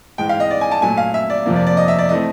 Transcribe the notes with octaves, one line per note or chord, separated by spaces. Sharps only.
G#2 E3 G#3 G5
F5
D#5
D5
G#5
A5
A#2 F#3 A3 G#5
F5
E5
D5
F2 C3 F3 A#3
D5
D5
D#5
E5
D5
E3 A3 C4 D#5